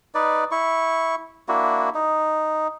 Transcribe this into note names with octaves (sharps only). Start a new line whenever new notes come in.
D#4 B4 D5
E4 C#6
A#3 D4 E4 F#4
D#4